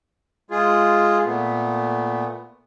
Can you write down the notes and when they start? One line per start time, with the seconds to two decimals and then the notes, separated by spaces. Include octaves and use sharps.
0.51 G#3 F4 G#4
1.24 A#2 A3 B3